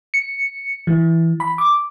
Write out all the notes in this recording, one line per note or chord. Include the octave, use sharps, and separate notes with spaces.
C#7
E3
B5
D6